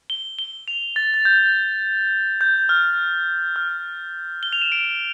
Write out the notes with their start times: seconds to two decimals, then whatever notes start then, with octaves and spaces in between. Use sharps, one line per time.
0.10 G7
0.39 G7
0.68 F7
0.96 A6
1.14 A6
1.25 G6
2.41 G6
2.69 F6
3.56 F6
4.43 G7
4.53 F7
4.62 E7
4.72 D7